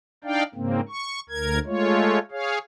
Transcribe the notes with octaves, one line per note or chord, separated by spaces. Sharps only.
D4 D#4 D5 F5 G5
G#2 C#3 A#3 C4
C#6
D2 A#4 G#6
G#3 A3 F4 C#5
G#4 C#5 F5